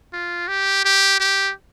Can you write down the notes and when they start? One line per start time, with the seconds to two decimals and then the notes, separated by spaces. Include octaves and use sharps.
0.13 F4
0.48 G4
0.85 G4
1.20 G4